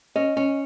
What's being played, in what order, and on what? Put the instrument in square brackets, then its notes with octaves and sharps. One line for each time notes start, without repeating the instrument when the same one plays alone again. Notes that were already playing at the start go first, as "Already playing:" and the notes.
[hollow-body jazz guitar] C#4 [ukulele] D#5
[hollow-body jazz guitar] C#4